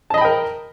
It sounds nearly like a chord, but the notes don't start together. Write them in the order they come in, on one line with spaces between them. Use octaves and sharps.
A5 D#5 B5 G5 A#4